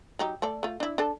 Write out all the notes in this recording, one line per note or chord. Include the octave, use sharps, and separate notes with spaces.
F#3 D#4 G4
A3 A4 D5
A3 F4
D4 E4
D4 A4 A5